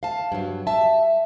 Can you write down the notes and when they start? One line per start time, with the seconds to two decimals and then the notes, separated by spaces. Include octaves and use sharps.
0.03 F5 A5
0.32 G2 F#3
0.67 E5 A5